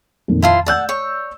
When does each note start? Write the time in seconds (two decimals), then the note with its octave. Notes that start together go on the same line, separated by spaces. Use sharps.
0.28 F2 A#2 D#3
0.42 E4 F4 C5 A5
0.66 D5 F#5 A5 E6 G6
0.89 C#5